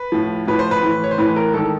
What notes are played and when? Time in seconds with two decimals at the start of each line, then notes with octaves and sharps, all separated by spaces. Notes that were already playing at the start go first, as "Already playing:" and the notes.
Already playing: B4
0.12 A2 F3
0.47 A2 F3 B4
0.59 C5
0.71 B4
0.83 A2 E3
1.04 C#5
1.11 C5
1.18 A2 E3 B4
1.36 A#4
1.53 G#2 D#3 A4